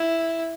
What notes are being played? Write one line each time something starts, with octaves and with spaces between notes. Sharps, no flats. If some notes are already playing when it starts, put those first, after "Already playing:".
Already playing: E4